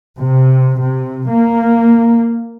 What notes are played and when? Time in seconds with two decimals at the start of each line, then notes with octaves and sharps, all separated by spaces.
0.19 C3
0.79 C3
1.28 A#3